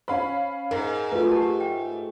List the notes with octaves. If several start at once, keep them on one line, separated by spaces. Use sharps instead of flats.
C#4 C5 F5 B5
G#2 A#4
A3 F4 A#4 B4
G4 A5
G5